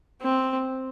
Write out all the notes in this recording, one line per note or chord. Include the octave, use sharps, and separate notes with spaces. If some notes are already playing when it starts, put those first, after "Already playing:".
C4